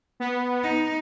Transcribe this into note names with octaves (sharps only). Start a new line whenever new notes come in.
B3
D#4